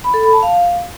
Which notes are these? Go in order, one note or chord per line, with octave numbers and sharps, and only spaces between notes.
B5
A4
B5
A5
F5